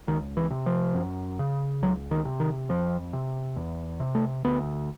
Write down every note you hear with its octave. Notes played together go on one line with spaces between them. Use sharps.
C#2 D#3
E3
C3
F3
F#2
C#3
C#2 F#3
D#3
C3
D#3
F2 F3
C3
E2
C3
A3
D2 B3